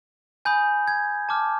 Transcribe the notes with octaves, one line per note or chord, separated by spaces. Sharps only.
G#5 B5 D#6 G6
G#6
A5 D6 F6